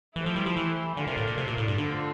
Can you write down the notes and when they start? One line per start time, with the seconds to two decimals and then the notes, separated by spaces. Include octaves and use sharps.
0.16 E3 A3 E4 G4 C5
0.26 F3
0.36 G3
0.46 F3
0.57 E3
0.97 D3 A3 D4 F4 A#4 D5
1.07 C3
1.17 A2
1.27 A#2
1.37 C3
1.47 A#2
1.57 A2
1.68 G2
1.78 D3 F3 A3 C4 F4 A4